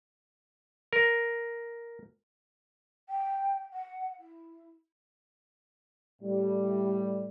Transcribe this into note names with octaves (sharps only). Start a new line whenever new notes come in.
A#4
G5
F#5
E4
A2 G3